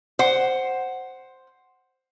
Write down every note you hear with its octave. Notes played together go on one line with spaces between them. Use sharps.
C5 F#5